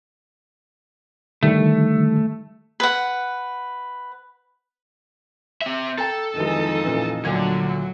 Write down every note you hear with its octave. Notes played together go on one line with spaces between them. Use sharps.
D3 D#3 G3 A3
B4 F#5
C4 E5
A4 G5 A#5
F2 D#3 E3 G#3 D#4 D#5
A#2 C#3 E3
D2 A#2 D3 F#3 G#6